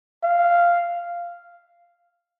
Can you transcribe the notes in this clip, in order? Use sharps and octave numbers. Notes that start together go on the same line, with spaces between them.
F5